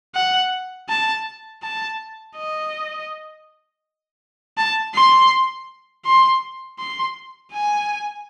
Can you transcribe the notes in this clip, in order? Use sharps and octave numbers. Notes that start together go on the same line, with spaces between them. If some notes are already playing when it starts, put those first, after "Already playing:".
F#5
A5
A5
D#5
A5
C6
C6
C6
G#5